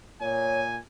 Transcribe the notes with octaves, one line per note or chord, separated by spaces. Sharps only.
A#2 C#5 G#5